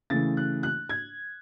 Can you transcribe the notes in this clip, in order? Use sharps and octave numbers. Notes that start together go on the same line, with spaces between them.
C#3 E3 A3 A6
F#6
F#6
G#6